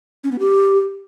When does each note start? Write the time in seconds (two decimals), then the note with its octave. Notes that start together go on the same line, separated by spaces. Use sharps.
0.24 C#4
0.32 B3
0.39 G4